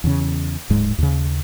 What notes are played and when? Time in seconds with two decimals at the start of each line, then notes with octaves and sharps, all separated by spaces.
0.04 E2 C#3
0.70 D1 G#2 G#3
0.98 D#2 C#3